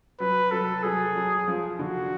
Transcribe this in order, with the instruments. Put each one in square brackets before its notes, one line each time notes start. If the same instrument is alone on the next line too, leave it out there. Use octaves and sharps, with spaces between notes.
[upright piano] F#3 [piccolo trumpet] B4
[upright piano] F#3 [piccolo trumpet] A4
[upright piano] F#3 [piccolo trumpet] G#4
[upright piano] F#3
F3
[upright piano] D3 [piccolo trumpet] F#4